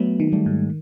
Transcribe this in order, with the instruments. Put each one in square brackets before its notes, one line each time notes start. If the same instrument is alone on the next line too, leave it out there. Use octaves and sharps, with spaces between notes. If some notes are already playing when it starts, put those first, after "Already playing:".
Already playing: [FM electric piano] F#3 [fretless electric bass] A3 B3
[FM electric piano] D#3
[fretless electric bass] G3 A3
[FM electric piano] G#2